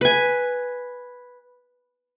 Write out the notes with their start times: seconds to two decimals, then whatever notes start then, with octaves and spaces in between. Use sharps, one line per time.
0.01 B4 G#5